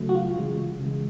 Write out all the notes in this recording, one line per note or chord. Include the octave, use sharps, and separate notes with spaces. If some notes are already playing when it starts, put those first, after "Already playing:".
Already playing: C#3 F#3 A3
F#4
F4
C#3 E3 G#3
C#3 E3 G#3